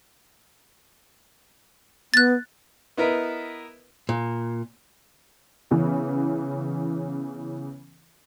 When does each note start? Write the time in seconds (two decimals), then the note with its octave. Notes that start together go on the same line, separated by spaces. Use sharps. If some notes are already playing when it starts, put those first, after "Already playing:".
2.14 B3 F#6 A6
2.97 B3 E4 A#4 B4 D#5
4.09 A#2
5.71 C#3 E3 B3 C#4